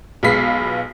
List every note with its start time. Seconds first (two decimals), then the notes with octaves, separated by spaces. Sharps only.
0.23 B1 G#3 B3 F4 B6 C7